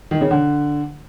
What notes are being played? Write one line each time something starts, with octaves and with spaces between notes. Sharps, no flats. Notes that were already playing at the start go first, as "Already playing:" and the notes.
D#3
C#3
D3